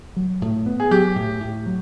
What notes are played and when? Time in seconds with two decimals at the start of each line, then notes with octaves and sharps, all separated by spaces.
0.16 F#3
0.42 A2
0.66 B3
0.80 G#4
0.91 F#3 G4
1.16 A2
1.40 A2
1.66 F#3